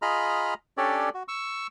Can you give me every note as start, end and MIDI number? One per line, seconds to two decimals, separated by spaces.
0.02 0.54 65
0.02 0.54 68
0.02 0.54 75
0.02 0.54 82
0.02 0.54 83
0.02 0.54 89
0.77 1.09 61
0.77 1.09 62
0.77 1.09 67
0.77 1.09 69
0.77 1.09 73
0.77 1.09 74
1.14 1.23 66
1.28 1.67 85
1.28 1.67 88